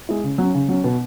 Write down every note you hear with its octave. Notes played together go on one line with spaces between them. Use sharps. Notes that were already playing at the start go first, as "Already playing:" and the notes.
G#3 E4
C#3
F#3 C#4
C#3
F#3 C#4
B2